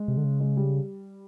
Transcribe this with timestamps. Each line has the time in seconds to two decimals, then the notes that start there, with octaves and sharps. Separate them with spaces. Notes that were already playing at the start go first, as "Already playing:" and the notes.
Already playing: G#3
0.08 C3
0.17 D3
0.24 C#3
0.40 G#3
0.57 G3